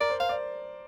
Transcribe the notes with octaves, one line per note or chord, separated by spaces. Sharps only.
A#4 D5
C5
C5 F5
D5